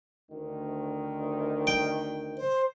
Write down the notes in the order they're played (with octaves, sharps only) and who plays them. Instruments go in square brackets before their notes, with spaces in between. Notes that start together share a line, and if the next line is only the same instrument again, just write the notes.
[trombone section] D2 D#3
[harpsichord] G5
[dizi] C5